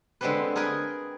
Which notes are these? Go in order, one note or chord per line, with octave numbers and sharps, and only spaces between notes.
D3 G#3 B3 C4 G4 B4
G#4 A#4 B4 D#5 G5